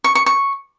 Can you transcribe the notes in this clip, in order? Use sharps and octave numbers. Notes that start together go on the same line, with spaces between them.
C#6
C#6
C#6